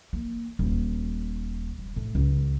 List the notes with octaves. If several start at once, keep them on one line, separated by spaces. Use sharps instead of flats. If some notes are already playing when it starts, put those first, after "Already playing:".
A#3
D#1
G2
A2
C#2